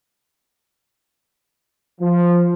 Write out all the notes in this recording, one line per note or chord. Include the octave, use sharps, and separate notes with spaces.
F3